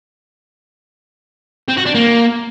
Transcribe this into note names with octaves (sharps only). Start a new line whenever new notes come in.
C4
F#4
D4
A#3